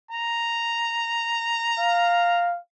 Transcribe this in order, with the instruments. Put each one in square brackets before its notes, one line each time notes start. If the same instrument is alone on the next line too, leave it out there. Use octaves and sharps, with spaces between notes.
[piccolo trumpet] A#5
[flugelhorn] F5